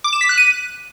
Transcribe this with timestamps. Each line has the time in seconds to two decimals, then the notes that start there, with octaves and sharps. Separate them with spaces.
0.04 D6
0.13 E7
0.21 B6
0.29 F#6
0.38 D#7